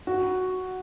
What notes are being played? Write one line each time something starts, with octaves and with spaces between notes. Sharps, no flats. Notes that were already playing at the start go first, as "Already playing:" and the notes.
F#4